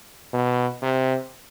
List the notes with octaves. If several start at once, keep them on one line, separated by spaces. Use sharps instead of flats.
B2
C3